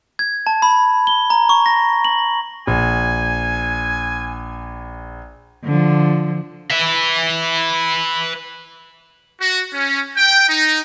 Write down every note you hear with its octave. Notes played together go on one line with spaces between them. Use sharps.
G#6
A5
B5
G7
A#5
C#6
A#6
F#7
A#1 G#5
D3 F3
B4 E5
F#4
C#4
G5
D#4